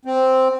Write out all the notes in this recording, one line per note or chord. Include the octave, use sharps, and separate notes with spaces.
C4